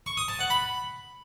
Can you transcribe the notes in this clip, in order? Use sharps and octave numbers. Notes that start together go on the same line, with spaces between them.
C#6
D#6
A5
F#5
B5